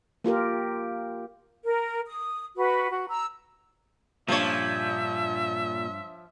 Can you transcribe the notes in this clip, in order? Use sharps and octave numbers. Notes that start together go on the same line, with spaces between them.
A#3 F4 G4 A#4
A#4
D#6
F#4 B4
F#4
A#5 E6
G2 A#2 F3 D4 C#5 E5